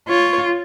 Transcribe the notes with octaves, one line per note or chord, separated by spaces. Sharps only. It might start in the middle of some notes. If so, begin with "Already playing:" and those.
F4 C#5